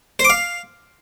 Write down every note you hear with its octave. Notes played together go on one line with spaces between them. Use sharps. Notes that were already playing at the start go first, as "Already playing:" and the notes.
C5
D6
F5